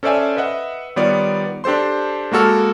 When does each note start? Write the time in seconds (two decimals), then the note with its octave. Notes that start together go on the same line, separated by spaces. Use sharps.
0.03 C#4 A4 C5 D5 E5 G#5
0.37 B4 D#5 E5 F#5
0.96 D#3 G3 B3 F4 C#5 D5
1.64 D4 G4 A4 C5 C6
2.32 G#3 A#3 F#4 A4 F6